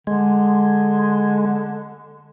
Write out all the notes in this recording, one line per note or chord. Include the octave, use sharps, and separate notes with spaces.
D3 G#3